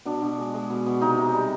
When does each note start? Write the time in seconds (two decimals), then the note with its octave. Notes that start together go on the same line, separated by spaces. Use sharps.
0.05 B2 D4
0.22 B2
0.38 G#3
0.54 G#3
0.70 B2
0.86 B2
1.01 C3 D#4
1.18 C3
1.34 G3